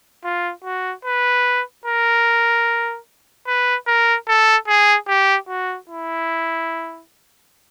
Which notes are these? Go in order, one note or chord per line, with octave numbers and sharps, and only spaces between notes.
F4
F#4
B4
A#4
B4
A#4
A4
G#4
G4
F#4
E4